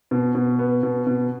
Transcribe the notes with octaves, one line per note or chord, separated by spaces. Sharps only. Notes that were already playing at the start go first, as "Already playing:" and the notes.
B2
B2
B3
B2
B2